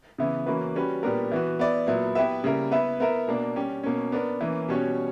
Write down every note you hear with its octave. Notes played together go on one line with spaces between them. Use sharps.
C#3 E3 B3 E4
E3 A#3 C#4 F#4 B4
G3 C#4 F#4 B4
A#2 G3 B3 D4 A#4
E3 B3 F#4
B3 E4 B4 D5
A#2 F#3 B3 E4
B3 E4 G4 B4 E5
C#3 G3 A#3 E4 A#4
B3 E4 B4 E5
B3 E4 A#4 E5
B2 A#3 D4
G3 C#4 G4
B2 A#3 C#4
B3 D4 A#4
E3 A#3 C#4
B2 G3 C#4 F#4 C#5